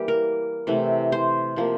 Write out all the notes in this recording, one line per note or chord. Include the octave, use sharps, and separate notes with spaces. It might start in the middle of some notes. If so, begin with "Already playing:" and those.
Already playing: E3 G3 A#3 G4
A#4
C3 E3 A3
C5
C3 F3 A#3